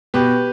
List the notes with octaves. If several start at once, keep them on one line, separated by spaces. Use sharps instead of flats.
B2 G4 B4